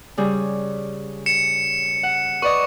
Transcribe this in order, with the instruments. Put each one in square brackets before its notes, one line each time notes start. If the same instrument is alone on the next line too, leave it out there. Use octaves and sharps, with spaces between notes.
[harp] C#3 G3 G#4
[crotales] C#7 E7
[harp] F#5
[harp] B4 D5 D#5 [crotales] C#6